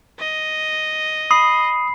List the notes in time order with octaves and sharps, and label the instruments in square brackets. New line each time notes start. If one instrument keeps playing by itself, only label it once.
[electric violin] D#5
[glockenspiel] B5 C7 [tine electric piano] D#6